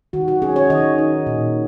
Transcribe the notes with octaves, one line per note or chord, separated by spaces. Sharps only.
D#3 F#4
F#4
C#4 G#4
C#5
D#3 D#5
D#4
A#2